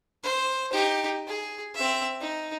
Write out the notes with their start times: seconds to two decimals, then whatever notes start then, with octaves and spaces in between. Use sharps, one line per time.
0.23 C5
0.72 D#4 G4
1.28 G#4
1.75 C4 E5
2.21 D#4